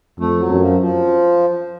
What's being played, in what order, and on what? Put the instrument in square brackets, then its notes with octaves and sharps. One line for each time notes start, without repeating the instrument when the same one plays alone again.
[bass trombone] F2 [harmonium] A3
[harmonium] F#3
[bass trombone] F#2
[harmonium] F3
F3